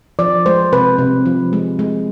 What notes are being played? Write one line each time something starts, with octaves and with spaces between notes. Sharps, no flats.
F3 D5
G#3 C5
C3 B4
C3
F3
G#3
G#3